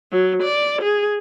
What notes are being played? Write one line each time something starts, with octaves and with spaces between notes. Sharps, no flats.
F#3
D5
G#4